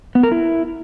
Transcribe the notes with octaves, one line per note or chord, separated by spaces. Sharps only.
B3
A#4
E4